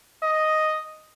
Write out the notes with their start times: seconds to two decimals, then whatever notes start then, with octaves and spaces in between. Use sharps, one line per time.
0.22 D#5